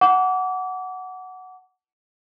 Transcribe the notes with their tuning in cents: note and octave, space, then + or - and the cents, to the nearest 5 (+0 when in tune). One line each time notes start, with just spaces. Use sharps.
F#5 +0 A5 +0 D6 -30